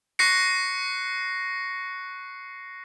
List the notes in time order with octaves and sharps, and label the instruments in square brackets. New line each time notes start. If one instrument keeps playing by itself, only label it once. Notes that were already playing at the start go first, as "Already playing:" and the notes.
[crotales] C#6 F#6 A#6 C7 C#7